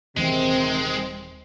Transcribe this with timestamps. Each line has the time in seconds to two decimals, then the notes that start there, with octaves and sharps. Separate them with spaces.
0.17 D#1 C3 D#3 E3 G#3 C4 C5